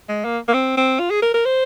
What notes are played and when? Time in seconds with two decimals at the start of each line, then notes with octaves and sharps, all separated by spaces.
0.09 G#3
0.25 A#3
0.48 A#3
0.54 C4
0.77 C4
0.99 F4
1.10 G#4
1.22 A#4
1.34 A#4
1.45 C5